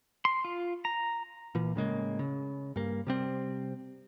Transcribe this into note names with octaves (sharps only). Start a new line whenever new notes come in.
C6
F4
A#5
A#2 E3
A2 C#3 G#3 A#3
C#3
G2 A#3
C3 G3 C4